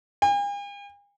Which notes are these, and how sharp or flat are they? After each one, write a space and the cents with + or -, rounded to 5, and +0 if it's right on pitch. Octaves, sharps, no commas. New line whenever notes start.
G#5 -45